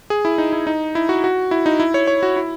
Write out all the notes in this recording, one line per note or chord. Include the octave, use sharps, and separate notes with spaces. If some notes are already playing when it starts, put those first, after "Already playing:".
G#4
E4
D#4
E4
D#4
E4
F#4
F#4
E4
D#4
E4
C#5
C#5
F#4
E4